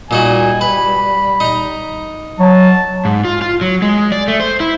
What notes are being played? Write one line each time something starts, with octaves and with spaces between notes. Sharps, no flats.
A#2 G3 D#4 F#4 G#5
B4 B5
D#4 A#5
F#3 A5
G#2
F4
F4
F#3
G#3
D5
A3
C5
E4